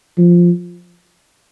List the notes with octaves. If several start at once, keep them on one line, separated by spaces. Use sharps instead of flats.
F3